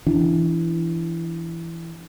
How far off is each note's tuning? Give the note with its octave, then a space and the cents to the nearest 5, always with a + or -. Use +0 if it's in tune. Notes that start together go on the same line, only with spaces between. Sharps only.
E3 +10 D4 -15